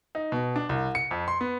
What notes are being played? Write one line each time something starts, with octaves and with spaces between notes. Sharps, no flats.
D#4
B2
D4
C2
C#7
F2
C6
B3